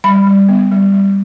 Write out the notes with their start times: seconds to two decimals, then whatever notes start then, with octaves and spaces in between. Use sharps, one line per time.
0.04 G3 B5
0.27 G3
0.49 B3
0.71 G3
0.94 G3